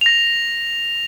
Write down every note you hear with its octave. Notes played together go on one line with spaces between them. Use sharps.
A#6 F7